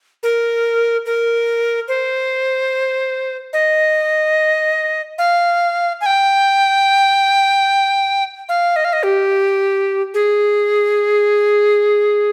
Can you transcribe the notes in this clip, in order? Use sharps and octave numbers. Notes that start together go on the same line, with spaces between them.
A#4
A#4
C5
D#5
F5
G#5
G5
F5
D#5
F5
D#5
G4
G#4